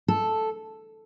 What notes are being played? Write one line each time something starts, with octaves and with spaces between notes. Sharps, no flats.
A4